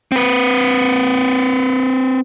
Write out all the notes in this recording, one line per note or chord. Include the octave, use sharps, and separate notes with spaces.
C4 B4